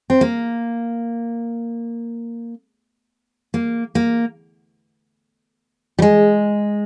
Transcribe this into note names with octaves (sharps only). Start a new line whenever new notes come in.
C4
A#3
A#3
A#3
G3
G#3